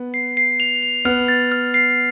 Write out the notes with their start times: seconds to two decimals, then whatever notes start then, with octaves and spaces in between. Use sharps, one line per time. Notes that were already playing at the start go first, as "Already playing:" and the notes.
Already playing: B3
0.14 C7
0.37 C7
0.60 F7
0.82 F7
1.05 B3 F6
1.28 A6
1.52 F6
1.74 C7